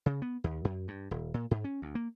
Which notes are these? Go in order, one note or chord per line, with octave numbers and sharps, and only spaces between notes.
C#3
B3
D#2
F#2
G2
D#1
A#2
G#2
C#4
D2
A#3